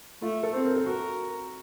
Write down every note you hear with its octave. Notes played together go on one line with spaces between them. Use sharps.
A3 F4
A4
C4 C5
A#4
A4
F#4 A#4